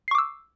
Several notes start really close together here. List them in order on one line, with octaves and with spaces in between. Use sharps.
C7 C#6 D6 E6